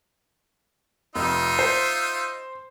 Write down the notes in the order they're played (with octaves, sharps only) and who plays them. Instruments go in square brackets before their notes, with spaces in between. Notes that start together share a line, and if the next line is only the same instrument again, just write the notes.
[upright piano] F1 [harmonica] D#4 F4 E5
[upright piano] C5